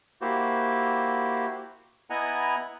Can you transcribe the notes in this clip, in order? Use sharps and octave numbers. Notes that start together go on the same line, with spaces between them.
A#3 E4 F#4 G4 C5
B3 E4 D#5 F#5 G#5 A#5